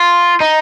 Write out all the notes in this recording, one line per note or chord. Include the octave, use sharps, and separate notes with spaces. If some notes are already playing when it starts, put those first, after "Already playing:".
Already playing: F4
D#4